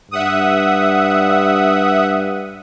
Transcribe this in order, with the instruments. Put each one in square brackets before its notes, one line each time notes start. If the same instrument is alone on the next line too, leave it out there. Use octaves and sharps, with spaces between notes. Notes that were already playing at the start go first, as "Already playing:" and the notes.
[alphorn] G2 [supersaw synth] E5 F#5 D#6